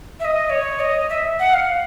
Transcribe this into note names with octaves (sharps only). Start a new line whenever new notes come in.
E5
D#5
C#5
D#5
E5
F#5
F5